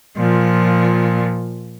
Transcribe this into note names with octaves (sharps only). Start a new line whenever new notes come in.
A#2 F3